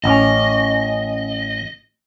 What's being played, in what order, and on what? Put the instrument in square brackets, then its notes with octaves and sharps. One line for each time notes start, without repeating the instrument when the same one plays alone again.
[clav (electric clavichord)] A1 C#4 [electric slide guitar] D#5